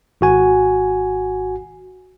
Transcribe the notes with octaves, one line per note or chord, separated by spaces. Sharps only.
G#1 F#4 G#5